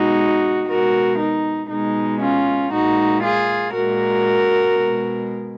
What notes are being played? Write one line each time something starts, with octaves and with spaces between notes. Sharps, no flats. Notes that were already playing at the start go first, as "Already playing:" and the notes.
Already playing: B2 G#3 D#4 F#4
B2 G#3 F#4 A#4
D#4
B2 G#3 D#4
C#4 F4
A#2 G#3 D#4 F#4
F4 G#4
A#2 G#3 F#4 A#4
B2 G#3